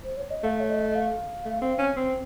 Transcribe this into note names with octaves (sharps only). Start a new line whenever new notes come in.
C5
C#5
D#5
A3 F5
C#5
D#5
D#5
F5
A3
C4
C#4
C4